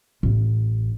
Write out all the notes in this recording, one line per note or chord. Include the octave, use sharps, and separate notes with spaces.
A1